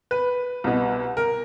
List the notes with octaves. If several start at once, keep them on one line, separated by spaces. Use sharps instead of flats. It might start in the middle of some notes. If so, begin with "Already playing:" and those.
B4
C2 B2
A#4